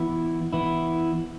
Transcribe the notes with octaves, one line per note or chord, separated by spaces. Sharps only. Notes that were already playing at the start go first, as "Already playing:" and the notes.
Already playing: E3 B3 E4
E3 B3 E4